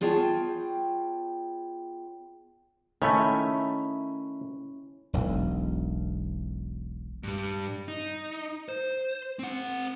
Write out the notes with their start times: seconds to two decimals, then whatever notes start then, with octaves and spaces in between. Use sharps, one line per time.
0.01 B3 F4 G#4 C#5 G5 A5
3.02 D#3 A3 C#4 E4
5.13 E1 B1
7.23 G2 G3
7.88 D#4
8.69 C5
9.39 C4 F#5